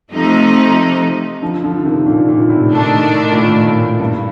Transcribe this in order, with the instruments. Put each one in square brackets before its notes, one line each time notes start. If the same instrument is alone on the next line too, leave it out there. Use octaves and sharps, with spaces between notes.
[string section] C3 F3 A3 D#4
[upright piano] D3 F3
D3 F3
D3
C3 D#3
A#2 D3
A#2 D3
A2 C3
[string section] D#3 A3 D4
[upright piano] A#2
A2
A2
G2